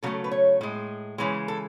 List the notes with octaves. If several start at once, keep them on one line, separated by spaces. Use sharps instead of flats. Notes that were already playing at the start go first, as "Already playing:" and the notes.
C#3 F#3 A3 A4
B4
C#5
A2 G#3
C#3 E3 G#3
A4